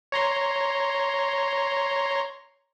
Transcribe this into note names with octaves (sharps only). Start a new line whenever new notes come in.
C#5 A#5 C6